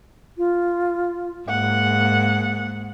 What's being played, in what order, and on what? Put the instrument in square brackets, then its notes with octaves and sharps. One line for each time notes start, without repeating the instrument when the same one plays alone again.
[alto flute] F4
[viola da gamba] G#2 [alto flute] A#3 [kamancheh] F#5